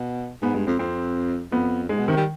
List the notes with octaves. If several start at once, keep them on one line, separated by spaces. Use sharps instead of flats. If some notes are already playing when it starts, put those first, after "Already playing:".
Already playing: B2
G#2 B3
G2 G#3
F2 C4
F2 C4
F2 B3
G#2 G#3
B2
C3 D#3
G3